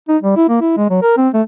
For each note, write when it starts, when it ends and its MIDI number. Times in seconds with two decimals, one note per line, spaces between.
0.08 0.17 63
0.22 0.37 55
0.37 0.45 64
0.49 0.60 58
0.61 0.74 64
0.77 0.88 56
0.90 0.99 54
1.02 1.14 70
1.17 1.29 60
1.34 1.42 57